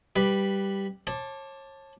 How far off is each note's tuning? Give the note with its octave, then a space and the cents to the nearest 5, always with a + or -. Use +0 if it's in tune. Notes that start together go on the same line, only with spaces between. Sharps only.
G3 +0 B4 +0 D6 +0
C#5 -35 A5 +0 D6 +0